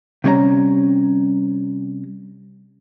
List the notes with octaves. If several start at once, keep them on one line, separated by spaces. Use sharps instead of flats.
C3 G3 C#4 C#5 A#5